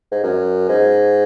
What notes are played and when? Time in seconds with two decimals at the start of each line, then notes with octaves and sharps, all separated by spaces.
0.12 G#2
0.23 F#2
0.69 G#2